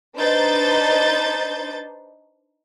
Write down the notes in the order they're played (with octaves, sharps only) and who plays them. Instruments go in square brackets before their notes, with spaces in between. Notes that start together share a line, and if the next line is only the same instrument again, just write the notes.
[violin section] D4 D#4 B4 C5 G6 A6